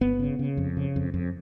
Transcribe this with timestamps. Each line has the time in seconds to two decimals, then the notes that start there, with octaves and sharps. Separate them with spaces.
0.01 G1 B3
0.19 C#3
0.39 C#3
0.57 F2
0.77 C#3
0.96 F2
1.14 F2